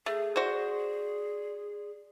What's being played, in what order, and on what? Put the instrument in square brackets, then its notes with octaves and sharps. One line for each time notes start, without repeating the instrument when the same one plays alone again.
[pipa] A3 [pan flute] G#4
[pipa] F#4 C5 [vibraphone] D5 C6